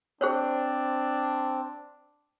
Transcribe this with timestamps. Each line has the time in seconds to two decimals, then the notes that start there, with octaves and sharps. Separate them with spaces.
0.21 C4 D4 G#4 C5 C#5